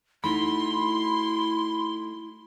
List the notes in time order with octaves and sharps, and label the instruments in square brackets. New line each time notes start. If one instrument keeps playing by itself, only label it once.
[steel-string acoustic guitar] A3 D#4 F#4 [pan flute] E4 [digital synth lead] B5 [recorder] C6